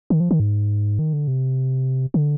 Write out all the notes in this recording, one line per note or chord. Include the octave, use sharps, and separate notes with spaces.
D#3
F3
D#3
G#2
D#3
D3
C3
D3